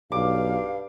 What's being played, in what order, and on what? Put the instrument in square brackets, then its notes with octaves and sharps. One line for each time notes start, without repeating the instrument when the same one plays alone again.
[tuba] B1 [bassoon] G2 [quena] F5 [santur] D6